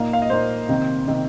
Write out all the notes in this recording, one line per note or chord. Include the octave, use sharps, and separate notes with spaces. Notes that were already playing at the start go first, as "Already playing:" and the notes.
Already playing: A#2 A#3 D#4 F5
F5
D#5
A#2 A#3 D#4 C5
C3 D#3 C4
C3 D#3 C4